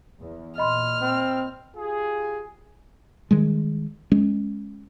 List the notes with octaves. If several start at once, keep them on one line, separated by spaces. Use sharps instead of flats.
E2
A#2 D#5 B5 C6 F6
C4
F4 G4 G#4
D#3 G3 G#3
G#3 C#4